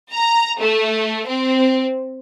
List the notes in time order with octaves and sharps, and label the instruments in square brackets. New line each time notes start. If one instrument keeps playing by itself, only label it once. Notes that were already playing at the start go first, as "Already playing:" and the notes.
[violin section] A#5
A3
C4